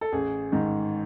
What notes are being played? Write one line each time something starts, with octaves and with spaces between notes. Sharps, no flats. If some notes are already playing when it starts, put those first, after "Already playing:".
A4
A1 G#4
G#2 D#3